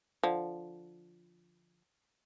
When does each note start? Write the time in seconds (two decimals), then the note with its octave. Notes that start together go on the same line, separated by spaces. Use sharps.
0.23 D3 F3